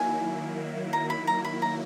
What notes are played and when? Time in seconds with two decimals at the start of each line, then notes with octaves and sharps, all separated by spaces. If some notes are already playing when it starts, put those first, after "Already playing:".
Already playing: D#3 F#3 A#3 E4 G#5
0.93 A#5
1.10 B5
1.27 A#5
1.45 B5
1.62 A#5